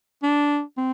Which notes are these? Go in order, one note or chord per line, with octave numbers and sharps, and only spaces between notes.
D4
C4